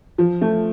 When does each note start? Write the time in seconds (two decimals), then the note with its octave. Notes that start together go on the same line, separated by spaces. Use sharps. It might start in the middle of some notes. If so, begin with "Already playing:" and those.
0.18 F3
0.41 A3